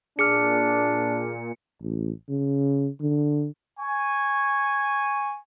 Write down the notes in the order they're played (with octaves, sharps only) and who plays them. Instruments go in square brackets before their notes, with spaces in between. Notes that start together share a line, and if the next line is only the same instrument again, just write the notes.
[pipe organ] A#2 [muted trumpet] D4 [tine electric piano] G#4 D6 F6 [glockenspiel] C#7
[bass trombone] A1
C#3
D3
[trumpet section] G#5 C#6